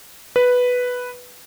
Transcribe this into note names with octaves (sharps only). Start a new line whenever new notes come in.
B4